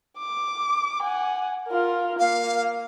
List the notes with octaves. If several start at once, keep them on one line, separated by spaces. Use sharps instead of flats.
D6
F#5 G#5
F4 A#4
A#3 F5